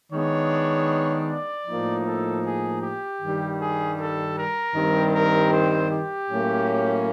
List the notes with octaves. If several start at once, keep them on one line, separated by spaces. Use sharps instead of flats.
D#3 G#3 B3 D4 C#5
D5
A2 F3 A#3 D#4
A4
G#4
G4
G2 D#3 G3
G#4
A4
A#4
G2 D#3 G3 C4
A#4
C5
G4
A2 F#3 A#3 C#4